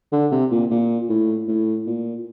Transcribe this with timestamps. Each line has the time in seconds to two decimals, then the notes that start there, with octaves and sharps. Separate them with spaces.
0.12 D3
0.31 C3
0.51 A#2
0.71 A#2
1.09 A2
1.48 A2
1.87 A#2